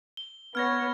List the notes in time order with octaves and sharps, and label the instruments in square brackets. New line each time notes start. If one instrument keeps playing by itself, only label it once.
[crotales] G7
[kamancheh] B3 C#5 [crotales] F6 G#6 A#6